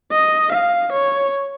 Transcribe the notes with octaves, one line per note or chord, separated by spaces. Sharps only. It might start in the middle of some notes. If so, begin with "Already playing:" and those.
D#5
F5
C#5